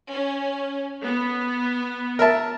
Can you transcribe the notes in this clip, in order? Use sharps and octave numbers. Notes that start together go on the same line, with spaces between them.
C#4
B3
A#4 E5 A5